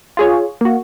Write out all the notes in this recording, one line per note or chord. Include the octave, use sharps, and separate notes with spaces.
F4 G#4 C#5
A#3 F#4